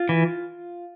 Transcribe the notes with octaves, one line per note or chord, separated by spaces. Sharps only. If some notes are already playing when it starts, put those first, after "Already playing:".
Already playing: F4
E3